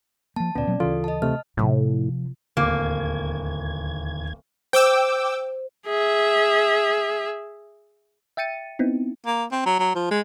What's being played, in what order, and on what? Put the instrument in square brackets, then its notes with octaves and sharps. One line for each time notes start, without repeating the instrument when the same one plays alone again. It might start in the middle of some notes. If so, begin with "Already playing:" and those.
[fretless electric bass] F3 A#3 [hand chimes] A5
[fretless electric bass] D2 A#2 [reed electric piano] B3 [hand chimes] C#4 D5
[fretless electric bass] B2 F#3 A#3
[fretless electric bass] D2 C#3 E3 [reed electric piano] F4 [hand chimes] A4
[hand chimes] D#5 A5
[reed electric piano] C3 A3 [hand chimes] F6
[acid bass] A2 [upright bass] C3 F3
[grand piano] D1 [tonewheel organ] D#2 G#6 [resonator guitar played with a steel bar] A#3
[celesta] C5 [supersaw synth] G5 D6 E6
[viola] G#4 E5
[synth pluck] E5 G5 A6 C#7 D#7
B3 C4 D#4 E4
[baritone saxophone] A#3
C4
F#3
F#3
F3
G#3